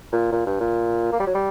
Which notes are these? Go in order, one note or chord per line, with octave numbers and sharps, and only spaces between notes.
A#2
A#2
G2
A#2
A#3
G3
F#3
G3